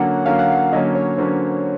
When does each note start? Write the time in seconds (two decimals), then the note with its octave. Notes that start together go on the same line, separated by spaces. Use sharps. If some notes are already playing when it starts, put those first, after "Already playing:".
Already playing: D3 F#3 A#3 C#4 F#5
0.26 D3 F#3 A#3 C#4 F5
0.39 F#5
0.52 F5
0.72 D3 F#3 A#3 C#4 D#5
0.95 C#5
1.18 D3 F#3 A#3 C#4 C5